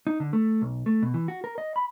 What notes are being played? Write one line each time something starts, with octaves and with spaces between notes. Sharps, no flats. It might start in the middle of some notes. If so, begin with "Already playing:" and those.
D#4
D3
A3
B1
A3
B2
E3
F#4
A#4
D#5
B5